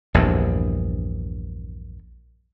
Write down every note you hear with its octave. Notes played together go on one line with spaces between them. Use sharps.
A#1 E2 G2